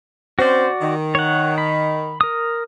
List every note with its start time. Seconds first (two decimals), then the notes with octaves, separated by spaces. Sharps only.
0.39 C4 C#4 F#4 C5 D5
0.81 D#3
1.15 C#5 F#5
1.58 B5
2.21 A#4 D#6